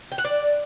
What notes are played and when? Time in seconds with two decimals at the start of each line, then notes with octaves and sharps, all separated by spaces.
0.12 G5
0.18 F#5
0.25 D5